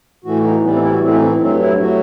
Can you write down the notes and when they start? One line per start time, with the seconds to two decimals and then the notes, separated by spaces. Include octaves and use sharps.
0.24 A2 E3 A3 F#4
0.44 D#4
0.63 A2 E3 G3 B3
0.73 C4
0.83 E4
0.92 F#4
1.02 A2 E3 A3 C4
1.14 D#4
1.21 C4
1.41 G2 F#3 A3 C4
1.60 E4
1.80 F#3 A3 F#4